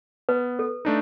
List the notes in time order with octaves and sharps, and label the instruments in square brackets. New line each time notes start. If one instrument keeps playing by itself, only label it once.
[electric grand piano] B3 [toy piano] B4
[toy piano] A4
[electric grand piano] A3 D4 D#4